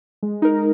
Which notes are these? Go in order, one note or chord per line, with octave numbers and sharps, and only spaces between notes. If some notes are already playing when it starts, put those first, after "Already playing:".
G#3
D#4 A#4